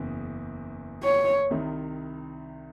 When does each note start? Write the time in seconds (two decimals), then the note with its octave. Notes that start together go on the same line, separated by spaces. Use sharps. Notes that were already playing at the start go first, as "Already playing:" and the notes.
Already playing: F#1 E2 C#3
1.03 C#5
1.50 C2 C3 D#3